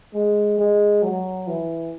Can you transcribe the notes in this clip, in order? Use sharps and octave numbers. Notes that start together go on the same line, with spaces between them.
G#3
G#3
F#3
E3